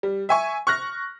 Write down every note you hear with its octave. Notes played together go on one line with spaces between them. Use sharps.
G3
E5 G#5 C#6
C#6 F6 F#6 A#6